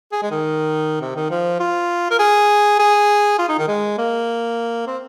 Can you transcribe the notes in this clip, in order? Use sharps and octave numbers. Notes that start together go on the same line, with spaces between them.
G#4
G#3
D#3
C3
D#3
F3
F4
A#4
G#4
G#4
F4
D#4
D#3
G#3
A#3
C4